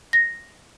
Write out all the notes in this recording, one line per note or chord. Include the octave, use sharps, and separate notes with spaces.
A#6